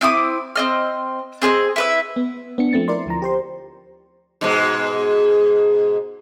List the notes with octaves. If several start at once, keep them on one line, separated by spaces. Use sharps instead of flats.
C4 E4 D6 D#6
C4 D#5 F6
C4 G#4 B4 D#5
E4 B4 E5
B3
B3 D4 C#7
F3 A3 C4 A6
E4 A#4 D5 C6
D2 F3 A#5
G4 C5 C6
G#2 B2 G#3